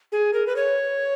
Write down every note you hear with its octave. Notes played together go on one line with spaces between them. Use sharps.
G#4
A#4
B4
C#5